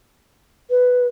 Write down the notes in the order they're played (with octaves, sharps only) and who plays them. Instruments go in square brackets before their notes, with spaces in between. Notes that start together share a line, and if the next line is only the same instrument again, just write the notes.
[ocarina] B4